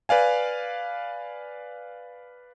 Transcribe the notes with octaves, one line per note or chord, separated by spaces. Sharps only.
B4 D5 F5 G#5